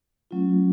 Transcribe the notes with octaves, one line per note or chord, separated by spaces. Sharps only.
F#3 A3 C#4 F4